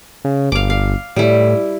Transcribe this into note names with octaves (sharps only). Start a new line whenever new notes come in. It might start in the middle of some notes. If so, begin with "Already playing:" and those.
C#3
G1 F5 D6
F5
A2 G3 E4